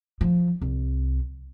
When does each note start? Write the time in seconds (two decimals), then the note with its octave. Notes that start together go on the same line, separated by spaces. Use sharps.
0.21 F3
0.61 C2